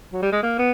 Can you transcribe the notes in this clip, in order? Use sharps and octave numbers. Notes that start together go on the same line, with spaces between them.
F#3
G3
G#3
A#3
B3